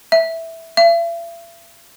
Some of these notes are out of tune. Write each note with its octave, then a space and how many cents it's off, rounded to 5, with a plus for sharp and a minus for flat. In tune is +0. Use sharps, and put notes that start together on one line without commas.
E5 -5
E5 +45